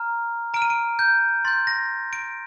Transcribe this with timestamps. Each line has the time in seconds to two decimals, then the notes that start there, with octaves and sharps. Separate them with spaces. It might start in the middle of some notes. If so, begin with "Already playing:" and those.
Already playing: A#5 F6
0.54 A#5 F6 D7
0.62 D#7
0.70 D7
0.99 G6
1.45 C6 G6 A6
1.67 A#6
2.13 D7